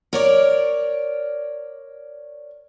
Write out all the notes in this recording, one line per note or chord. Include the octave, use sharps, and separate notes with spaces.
A#4 C#5 D5